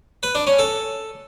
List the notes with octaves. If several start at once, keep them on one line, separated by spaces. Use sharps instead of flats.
B4
D4
C#4
A4